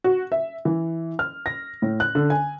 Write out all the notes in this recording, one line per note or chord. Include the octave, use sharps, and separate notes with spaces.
F#4
E5
E3
F6
A#6
A2
F#6
D3
G#5